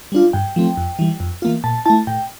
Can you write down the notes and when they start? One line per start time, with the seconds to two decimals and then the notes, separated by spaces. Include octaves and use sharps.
0.12 G3 D4 F4
0.33 G2 G5
0.56 F3 A3 C4
0.77 F2
0.99 E3 G3
1.20 F2
1.42 E3 A#3 F4
1.64 A#2 A5
1.86 A3 E4 A5
2.07 A2 G5